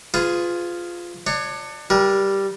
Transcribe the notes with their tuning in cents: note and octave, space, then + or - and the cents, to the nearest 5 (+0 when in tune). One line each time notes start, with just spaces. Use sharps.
F4 +0 G#4 +0 B4 +40
D4 +30 C#5 +0
G3 +0 A#4 +35